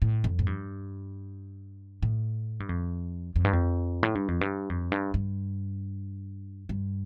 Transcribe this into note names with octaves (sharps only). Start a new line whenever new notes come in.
A2
F2
A2
G2
A2
G2
F2
F2
G2
F2
A2
G2
F2
G2
F2
G2
G2
G2